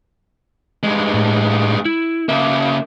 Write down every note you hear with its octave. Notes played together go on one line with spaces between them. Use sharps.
G2 G#3
A2
E4
C#3 A#3 E5